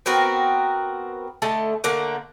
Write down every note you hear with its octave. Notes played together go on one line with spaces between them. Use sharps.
B3 C4 F#4 A#4
D3 A3 D#5 A5
D3 A3 A#3 F#5